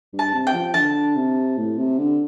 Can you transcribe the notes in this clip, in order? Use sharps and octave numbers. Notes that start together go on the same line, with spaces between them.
G2
A5
C3
G5
F3
D3 A5
C3
A2
C3
D3